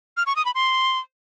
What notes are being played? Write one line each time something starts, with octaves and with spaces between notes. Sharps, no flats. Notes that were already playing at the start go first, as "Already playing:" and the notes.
F6
C#6
D#6
B5
C6